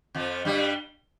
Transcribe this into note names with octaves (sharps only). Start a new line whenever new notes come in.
F2 F3
G2 G3